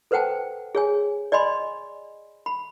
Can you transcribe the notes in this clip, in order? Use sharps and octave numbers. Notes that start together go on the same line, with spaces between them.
A4 B4 C5 F#5 G5 A5
G#4 C#5 G#5
D5 D#5 G#5 B5 C6
B5